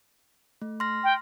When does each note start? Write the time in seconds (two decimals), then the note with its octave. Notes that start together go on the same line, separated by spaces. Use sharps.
0.62 A3
0.80 C6 F6 A#6
1.04 G5